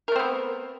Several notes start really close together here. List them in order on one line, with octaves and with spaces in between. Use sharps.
A#4 A3 C4 B3